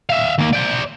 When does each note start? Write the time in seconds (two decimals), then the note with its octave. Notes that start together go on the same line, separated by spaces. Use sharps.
0.10 E5 F5
0.38 D#2 A#3
0.53 C5 D5